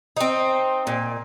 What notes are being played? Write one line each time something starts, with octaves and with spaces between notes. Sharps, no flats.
C4 D#4
A#2